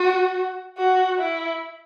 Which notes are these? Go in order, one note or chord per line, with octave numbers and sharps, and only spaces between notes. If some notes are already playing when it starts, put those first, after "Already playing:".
Already playing: F#4
F#4
E4